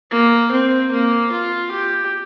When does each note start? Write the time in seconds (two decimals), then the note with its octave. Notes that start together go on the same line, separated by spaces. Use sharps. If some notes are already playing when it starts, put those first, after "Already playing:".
0.11 A#3
0.51 C4
0.91 A#3
1.31 F4
1.71 G4